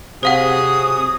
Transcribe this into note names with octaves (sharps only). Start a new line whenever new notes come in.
C3 F#3 G#4 C5 F5 F#5 D#6